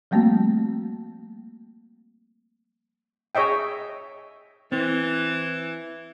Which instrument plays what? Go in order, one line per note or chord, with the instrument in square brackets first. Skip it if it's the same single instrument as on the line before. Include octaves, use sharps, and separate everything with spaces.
[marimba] F3 G3 A3 A#3 C4 F#4
[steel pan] G#4 C#5 D#5 E5 G5
[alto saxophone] E3 [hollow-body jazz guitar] C4